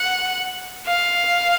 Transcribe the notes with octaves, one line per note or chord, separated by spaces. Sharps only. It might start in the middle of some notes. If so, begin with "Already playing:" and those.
Already playing: F#5
F5